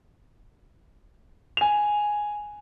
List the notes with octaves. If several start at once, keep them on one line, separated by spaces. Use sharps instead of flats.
G#5 F7